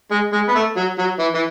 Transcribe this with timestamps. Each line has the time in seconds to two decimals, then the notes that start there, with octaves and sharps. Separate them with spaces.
0.11 G#3
0.32 G#3
0.48 B3
0.55 A3
0.77 F#3
0.98 F#3
1.19 E3
1.34 E3